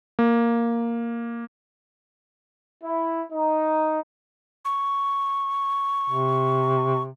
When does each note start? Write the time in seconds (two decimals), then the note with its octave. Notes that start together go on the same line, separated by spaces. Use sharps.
0.19 A#3
2.84 E4
3.33 D#4
4.65 C#6
6.10 C3